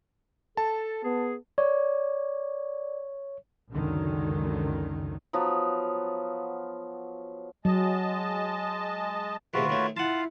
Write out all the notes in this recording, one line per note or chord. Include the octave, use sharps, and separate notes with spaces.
A4 A5
B3 G#4
C#5 D5
C#2 F#2 D3 D#3 F#3
F3 F#3 B3
F#3 G#3 D#5 A5
D2 C3 D#3 F4 F#4 G#4 B4
D#3 A3 C#5
E4 F4 F5 F#5 A5